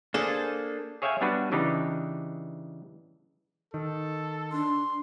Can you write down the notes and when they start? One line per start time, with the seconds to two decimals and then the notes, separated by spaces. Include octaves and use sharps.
0.14 A#3 D4 G#4 A4 C5
1.02 G#4 C#5 E5 F5 G5 G#5
1.21 G3 B3 D4 F#4 B4
1.52 C#3 E3 D4 D#4 G4
3.74 D#3 A4
4.52 D4 C6